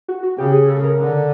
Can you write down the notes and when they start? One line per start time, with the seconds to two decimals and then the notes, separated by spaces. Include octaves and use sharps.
0.08 F#4
0.23 F#4
0.38 C#3 G4
0.52 G#4
0.68 A4
0.83 A#4
0.98 D3